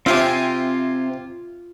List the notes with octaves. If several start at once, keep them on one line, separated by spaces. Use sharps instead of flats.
C3 C4 F4 C5 E5 G5 G#5